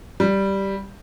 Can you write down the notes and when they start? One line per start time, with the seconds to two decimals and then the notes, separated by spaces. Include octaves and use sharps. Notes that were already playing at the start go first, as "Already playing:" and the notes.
0.20 G3